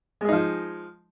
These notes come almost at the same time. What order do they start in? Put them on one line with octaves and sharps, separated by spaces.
G#3 G#4 D#4 F3